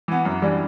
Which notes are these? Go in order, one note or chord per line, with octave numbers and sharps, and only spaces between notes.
E3 B3
F#2
E3 G3 D4